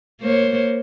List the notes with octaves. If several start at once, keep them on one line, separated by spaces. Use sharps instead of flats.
A#3 C5 C#5